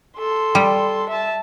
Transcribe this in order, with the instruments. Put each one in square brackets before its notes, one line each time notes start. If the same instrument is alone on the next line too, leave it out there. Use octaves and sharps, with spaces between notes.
[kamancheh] A4 C6
[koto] G3
[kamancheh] E5 A5